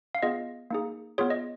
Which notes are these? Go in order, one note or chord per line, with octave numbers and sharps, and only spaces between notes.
F5
B3 F4 G#4 D#5
A#3 D#4 G#4
B3 F4 G#4 C#5
D#5